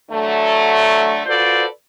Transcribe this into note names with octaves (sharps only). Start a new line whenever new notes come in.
D3 E3 F#3 A3
F4 F#4 A4 B4 C5 D5